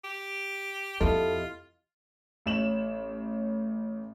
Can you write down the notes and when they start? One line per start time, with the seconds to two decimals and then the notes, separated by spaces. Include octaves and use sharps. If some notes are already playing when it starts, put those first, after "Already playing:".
0.04 G4
1.01 F2 E4 F4 G4 A4 D#5
2.46 A1 C#5 E7 F#7